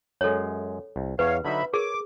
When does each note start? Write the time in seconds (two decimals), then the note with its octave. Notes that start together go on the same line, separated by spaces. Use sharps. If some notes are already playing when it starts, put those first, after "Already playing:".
0.21 F#2 G#3 A4 C#5
0.96 C2
1.19 E2 B4 C#5 F5
1.45 D3 F#3 D#4 E5 B5
1.74 G#4 A#4 C#5 D6